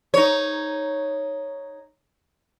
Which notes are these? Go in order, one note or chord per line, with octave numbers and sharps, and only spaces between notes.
D#4 C#5